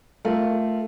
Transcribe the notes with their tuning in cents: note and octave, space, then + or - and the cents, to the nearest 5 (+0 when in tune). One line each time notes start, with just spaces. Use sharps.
A3 +0 F4 +0 A#4 +0